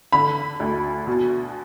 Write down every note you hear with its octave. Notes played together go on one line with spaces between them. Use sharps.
D3 B5
D2
B2